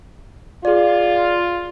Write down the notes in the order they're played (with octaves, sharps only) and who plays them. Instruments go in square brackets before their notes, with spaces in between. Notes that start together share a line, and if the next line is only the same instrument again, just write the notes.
[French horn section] F4 [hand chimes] G#4 D5